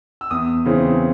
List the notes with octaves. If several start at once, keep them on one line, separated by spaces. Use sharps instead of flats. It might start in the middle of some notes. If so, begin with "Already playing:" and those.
E6
E2 D#6
C#3 E3 C4